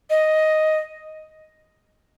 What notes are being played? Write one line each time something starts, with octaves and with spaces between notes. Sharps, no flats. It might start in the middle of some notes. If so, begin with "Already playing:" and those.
D#5